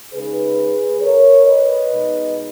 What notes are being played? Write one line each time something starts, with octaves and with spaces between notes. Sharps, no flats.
C#3 G#3 D#4 G#4 B4
A#4 C#5
B4 D#5
B2 G#3 D#4